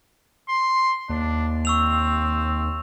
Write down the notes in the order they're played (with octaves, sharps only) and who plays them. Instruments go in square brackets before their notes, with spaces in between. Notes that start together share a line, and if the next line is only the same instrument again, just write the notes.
[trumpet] C6
[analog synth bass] D#2 [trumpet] D4
[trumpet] C4 [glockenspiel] C#6 E6 F7